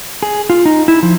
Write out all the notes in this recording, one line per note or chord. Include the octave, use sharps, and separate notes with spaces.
G#4
F4
D#4
E4
F3